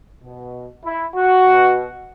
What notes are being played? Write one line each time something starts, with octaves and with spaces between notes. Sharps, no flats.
B2
E4
F#4
B2